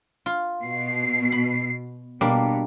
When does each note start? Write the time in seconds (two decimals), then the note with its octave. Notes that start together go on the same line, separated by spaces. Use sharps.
0.26 F4
0.62 B2 C7
1.32 B5
2.21 B2 G3 A#3 D4